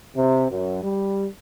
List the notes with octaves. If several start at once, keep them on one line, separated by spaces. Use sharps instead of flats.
C3
F#2
G3